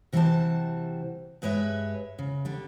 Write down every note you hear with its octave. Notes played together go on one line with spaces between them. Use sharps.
C3 E3 G3 F#4 C5 A5
G2 G#3 B4 C#5 E5
C#3
D3 G3